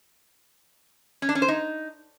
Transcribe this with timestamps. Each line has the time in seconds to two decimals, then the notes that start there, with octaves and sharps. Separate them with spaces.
1.22 C#4
1.29 D4
1.35 C#4
1.42 C5
1.48 D#4